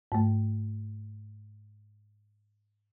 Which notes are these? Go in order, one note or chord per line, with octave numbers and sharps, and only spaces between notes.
G#2 A3